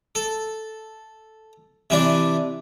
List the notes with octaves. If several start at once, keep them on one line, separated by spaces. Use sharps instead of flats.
A4
C3 E3 D4